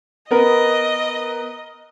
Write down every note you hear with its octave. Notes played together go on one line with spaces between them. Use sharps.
B3 A#4 B4 D#5